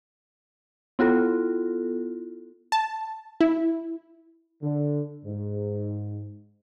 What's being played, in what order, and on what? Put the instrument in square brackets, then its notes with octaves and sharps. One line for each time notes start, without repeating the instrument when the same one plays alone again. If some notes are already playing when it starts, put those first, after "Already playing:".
[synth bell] B3 E4 F4 A4
[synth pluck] A5
E4
[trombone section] D3
G#2